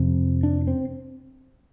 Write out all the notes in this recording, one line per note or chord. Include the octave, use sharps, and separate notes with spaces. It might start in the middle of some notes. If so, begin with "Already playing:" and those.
Already playing: F2 C3
D4
C4